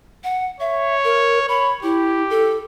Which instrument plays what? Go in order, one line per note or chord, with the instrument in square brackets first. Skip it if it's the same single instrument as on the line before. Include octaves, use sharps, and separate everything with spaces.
[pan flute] F#5
[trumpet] C#5 [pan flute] E5
[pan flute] A#4
[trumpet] C#5 [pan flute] B5
[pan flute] E4 [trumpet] G4
[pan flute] A4